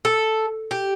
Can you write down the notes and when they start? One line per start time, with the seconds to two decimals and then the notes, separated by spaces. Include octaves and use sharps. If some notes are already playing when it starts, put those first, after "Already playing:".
0.05 A4
0.71 G4